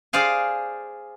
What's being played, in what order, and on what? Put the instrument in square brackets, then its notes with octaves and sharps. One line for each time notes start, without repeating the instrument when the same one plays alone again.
[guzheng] G#4 C5 D5 F5 G#5